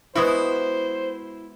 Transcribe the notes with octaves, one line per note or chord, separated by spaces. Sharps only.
G#3 B3 E4 F#4 C5